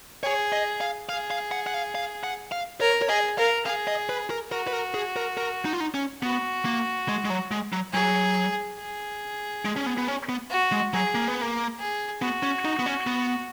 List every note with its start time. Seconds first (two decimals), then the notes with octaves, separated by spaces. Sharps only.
0.23 G#4 C#5
0.52 D#5
0.81 F5
1.09 G#4 F5
1.31 F5
1.51 F#5
1.67 F#5
1.74 F5
1.95 F5
2.24 F#5
2.52 F5
2.81 A#4 C#5
3.02 C#5
3.09 G#4 D#5
3.38 A#4 F5
3.65 G#4 F5
3.87 D#5
4.09 B4
4.30 A#4
4.51 F#4 A#4
4.67 B4
4.73 A#4
4.94 G#4
5.16 A#4
5.37 A#4
5.65 D#4
5.73 F4
5.80 D#4
5.94 C#4
6.22 B3 F#4
6.65 A#3
7.09 G#3
7.25 G#3
7.30 F#3
7.51 G#3
7.73 F#3
7.93 F#3 G#4
8.79 G#4
9.65 G#3
9.76 C#4
9.86 B3
9.98 B3
10.08 C#4
10.29 B3
10.50 F#4
10.72 G#3
10.93 F#3 G#4
11.15 A#3
11.28 B3
11.42 A#3
11.79 G#4
12.22 B3 F#4
12.43 C#4
12.65 D#4
12.79 B3
12.86 C#4
13.07 B3